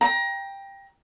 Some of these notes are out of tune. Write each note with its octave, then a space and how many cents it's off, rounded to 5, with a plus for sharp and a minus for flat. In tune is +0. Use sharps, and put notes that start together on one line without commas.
G5 +10 A#5 +25